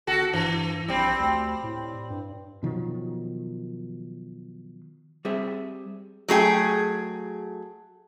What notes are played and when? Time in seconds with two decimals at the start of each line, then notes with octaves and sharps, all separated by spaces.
0.07 G1 F#4 A4
0.33 G2 E3
0.88 A#1 G3 C4
1.20 D2
1.63 A2
2.10 G2
2.63 B2 D#3 F3 F#3
5.25 G3 C4 G#4 C5 E5
6.28 F#3 A3 G#4 G5